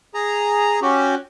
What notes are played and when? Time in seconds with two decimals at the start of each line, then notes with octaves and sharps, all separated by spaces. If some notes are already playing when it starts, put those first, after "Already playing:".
0.14 G#4 A#5
0.82 C#4 F#4 G4